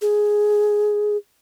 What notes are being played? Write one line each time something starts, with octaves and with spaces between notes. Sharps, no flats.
G#4